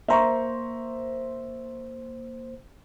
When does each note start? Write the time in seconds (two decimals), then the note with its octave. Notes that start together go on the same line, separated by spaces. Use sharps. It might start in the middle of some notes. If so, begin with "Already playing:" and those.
0.08 A#3 C5 E5 A#5 C#6